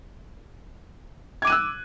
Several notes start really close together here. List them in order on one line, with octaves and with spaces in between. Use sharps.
G#6 D6 D#7 F#6 E6